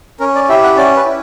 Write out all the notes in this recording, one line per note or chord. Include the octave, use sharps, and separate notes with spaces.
C#4 A#4
D5
E4 G4 E5
F#5
C#4 D5
B4
E4